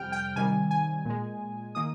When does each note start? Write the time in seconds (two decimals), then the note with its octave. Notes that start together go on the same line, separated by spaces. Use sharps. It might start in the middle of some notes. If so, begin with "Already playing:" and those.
Already playing: F2 C3 G3 G5 F6
0.12 G5
0.36 C3 D#3 G3 G#5
0.71 G#5
1.05 A#2 G#3
1.75 D#3 A#3 D#6